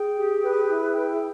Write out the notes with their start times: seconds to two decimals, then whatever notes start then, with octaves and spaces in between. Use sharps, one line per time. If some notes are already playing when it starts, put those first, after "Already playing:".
Already playing: G#4 G5
0.17 G4
0.43 B4
0.68 E4
0.94 G5